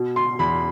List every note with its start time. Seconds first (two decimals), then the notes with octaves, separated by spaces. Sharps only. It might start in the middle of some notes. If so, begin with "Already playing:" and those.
Already playing: B2
0.16 C6
0.39 E2 B5